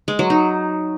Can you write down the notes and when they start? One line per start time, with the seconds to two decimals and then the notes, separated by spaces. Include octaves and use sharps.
0.08 G#3
0.19 F#3
0.30 D#4